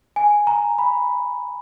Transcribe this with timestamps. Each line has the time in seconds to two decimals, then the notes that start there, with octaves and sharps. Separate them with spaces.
0.16 G#5
0.47 A#5
0.78 B5